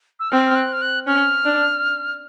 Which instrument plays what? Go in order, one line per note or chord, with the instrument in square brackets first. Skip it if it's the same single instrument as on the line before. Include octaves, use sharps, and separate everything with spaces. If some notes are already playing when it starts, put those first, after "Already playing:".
[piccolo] E6
[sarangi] C4 [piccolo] F6
[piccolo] F6
F#6
F6
F#6
[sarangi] C#4 [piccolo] F6
[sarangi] D4